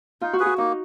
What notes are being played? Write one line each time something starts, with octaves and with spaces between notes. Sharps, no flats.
D#4 F4
F#4
G#4 B4
F#4
A#3 D#4